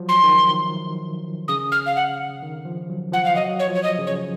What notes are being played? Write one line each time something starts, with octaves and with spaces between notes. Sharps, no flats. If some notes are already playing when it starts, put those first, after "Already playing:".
Already playing: F3 F#3
C6
D#3
C#3 D#6
F6
F5
F#5
D#3
F3
F#3
F3 F#5
F5
F#3 D#5
C#5
F3
C#5
D#5
C#3
C#5